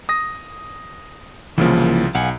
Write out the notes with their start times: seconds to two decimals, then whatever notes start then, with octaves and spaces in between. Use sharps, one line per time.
0.09 D#6 A#6
1.58 C2 C#3 E3 F3 A#3
2.15 B1 F5 F#5 G#5